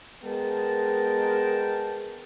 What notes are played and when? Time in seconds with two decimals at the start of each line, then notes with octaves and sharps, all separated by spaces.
0.24 G#3 B3 A#4 G5 A5